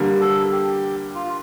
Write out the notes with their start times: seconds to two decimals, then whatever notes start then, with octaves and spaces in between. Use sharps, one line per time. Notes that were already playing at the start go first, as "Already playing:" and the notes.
Already playing: D3 G3 A#3
0.21 A4
0.52 G4
1.15 F4